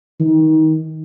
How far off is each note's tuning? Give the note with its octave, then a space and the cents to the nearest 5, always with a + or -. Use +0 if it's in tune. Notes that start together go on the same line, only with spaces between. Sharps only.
D#3 +20